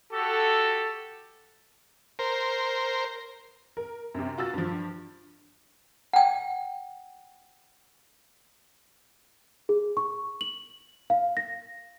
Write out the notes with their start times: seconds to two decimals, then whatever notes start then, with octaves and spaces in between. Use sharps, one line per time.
0.12 F#4 G4 A4
2.19 A#4 C5
3.77 A#4
4.14 F#2 C3
4.38 F4 F#4 E6 A6
4.54 G2 F3
6.13 F#5 G5
9.69 G#4
9.97 C#6
10.41 F#7
11.10 F5
11.37 A#6